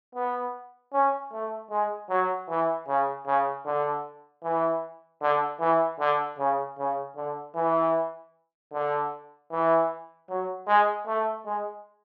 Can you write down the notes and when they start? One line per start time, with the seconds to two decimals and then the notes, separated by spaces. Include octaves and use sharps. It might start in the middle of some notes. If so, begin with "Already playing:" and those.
0.15 B3
0.93 C#4
1.32 A3
1.70 G#3
2.09 F#3
2.49 E3
2.88 C#3
3.26 C#3
3.65 D3
4.43 E3
5.22 D3
5.60 E3
5.99 D3
6.39 C#3
6.78 C#3
7.16 D3
7.56 E3
8.73 D3
9.51 E3
10.29 F#3
10.67 G#3
11.07 A3
11.45 G#3